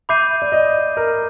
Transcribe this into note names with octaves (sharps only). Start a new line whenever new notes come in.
E5 B5 D6 G6 C7 D#7
D5
D#5
A#4